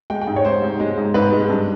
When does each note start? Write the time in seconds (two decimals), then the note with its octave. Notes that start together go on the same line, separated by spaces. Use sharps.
0.10 G#3 G5
0.21 G5
0.27 G#2
0.36 C#5
0.45 G#2 C5
0.62 G#2
0.80 G#3
0.97 G#2
1.14 G#2 B4
1.32 G#3
1.50 G2